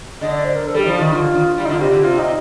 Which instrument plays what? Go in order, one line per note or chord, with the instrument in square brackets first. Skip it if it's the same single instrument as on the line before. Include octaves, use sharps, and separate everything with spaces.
[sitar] D3 [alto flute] D#5
[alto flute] D5
C5
A#4
A4
[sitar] G3 [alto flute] G4
[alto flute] D#4
[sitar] F3 [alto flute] F4
[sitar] D#3 [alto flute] D#4
[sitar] D3 [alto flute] F4
[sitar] D#3
[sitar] G3 [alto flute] F4
[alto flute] D#4
[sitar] D3
[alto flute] F4
[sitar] C3 [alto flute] G4
[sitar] D3
[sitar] C3 [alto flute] F4
[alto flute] D#4